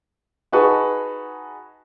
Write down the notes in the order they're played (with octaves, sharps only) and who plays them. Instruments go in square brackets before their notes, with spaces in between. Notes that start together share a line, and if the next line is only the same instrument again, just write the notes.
[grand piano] D#4 F#4 G#4 B4 A5 C#6